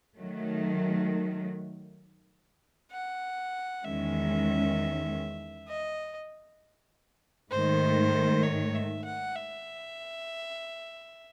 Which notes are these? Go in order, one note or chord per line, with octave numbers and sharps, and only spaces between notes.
D#3 F#3 A3
F#5
E2 D#3 G#3 C#4 E5
D#5
G#2 D#3 A3 C5
C#5
E5
F#5
E5